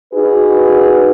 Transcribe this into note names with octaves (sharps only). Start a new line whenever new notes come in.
D#4 F#4 G#4 B4